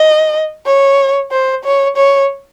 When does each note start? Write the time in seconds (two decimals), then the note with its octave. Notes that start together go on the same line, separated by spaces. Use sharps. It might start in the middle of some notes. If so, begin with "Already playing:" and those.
Already playing: D#5
0.66 C#5
1.31 C5
1.64 C#5
1.97 C#5